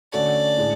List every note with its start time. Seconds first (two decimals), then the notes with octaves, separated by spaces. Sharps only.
0.12 D3 A3 C#4 F#4 A4 D5
0.58 A2 G#3 D4